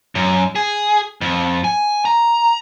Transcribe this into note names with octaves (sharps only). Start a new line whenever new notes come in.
F#2
G#4
F2
G#5
A#5